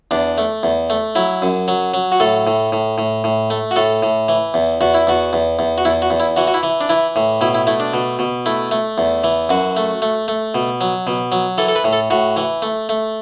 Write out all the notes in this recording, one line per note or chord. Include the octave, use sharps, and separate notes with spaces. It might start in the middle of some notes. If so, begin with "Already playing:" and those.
E2 D4
A3
E2
A3
F#3 E4
F#2
F#3
F#3
F#4
A2 A4
A2
A2
A2
A2
A3
F#4
A2 A4
A2
E3
E2
E2 F#4
E4
E2 F#4
E2
E2
F#4
E2 E4
F#4
E2
E4
E3 F#4
F#4
E4
E3
D4
E3 E4
A2
B2 E4
E4
A3 E4
D4
B2
B2
A3 E4
A3
E2
E3
F#2 F#4
A3
A3
A3
B2
F#3
B2
F#3
E3 A4
A4
B4
A2
A4
A2 F#4
E3
A3
A3